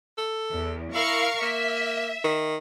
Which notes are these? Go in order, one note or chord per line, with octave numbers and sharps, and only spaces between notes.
A4
E2
E4 A#4 F5 C#6
A#3 E5
D#3